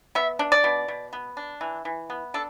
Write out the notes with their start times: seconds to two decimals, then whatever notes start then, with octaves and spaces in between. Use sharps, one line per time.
0.15 B3 E5
0.39 D4
0.52 D5
0.64 B2
0.88 B2
1.13 B3
1.37 D4
1.61 E3
1.85 E3
2.10 B3
2.34 D4 A4